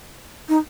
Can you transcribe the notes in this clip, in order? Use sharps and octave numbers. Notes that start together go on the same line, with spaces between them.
D#4